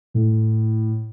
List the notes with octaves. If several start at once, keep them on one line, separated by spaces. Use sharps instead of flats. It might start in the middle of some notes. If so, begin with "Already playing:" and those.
A2